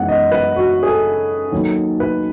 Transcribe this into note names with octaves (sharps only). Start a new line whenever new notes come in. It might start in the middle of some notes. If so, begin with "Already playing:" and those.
Already playing: F#2 E3 G#3 B3 D#4 F#5
D#5
B4
F#4
G#4
A4
D#2 D#3 F#3
B4